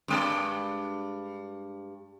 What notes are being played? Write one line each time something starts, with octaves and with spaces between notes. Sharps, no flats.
G2 G#3 D5